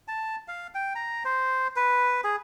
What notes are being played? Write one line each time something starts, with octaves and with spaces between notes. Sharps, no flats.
A5
F5
G5
A#5
C5
B4
G#4